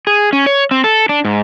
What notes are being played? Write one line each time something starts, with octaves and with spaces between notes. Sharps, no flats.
G#4
C#4
C#5
C4
A4
D4
G#2